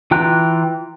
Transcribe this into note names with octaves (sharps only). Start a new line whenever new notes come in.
E3 F4 G5 A#5 F#6